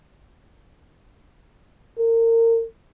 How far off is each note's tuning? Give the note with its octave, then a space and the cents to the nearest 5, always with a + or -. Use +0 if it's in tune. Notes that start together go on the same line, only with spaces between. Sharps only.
A#4 -30